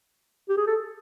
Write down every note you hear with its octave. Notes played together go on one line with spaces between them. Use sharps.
G4
G#4
A4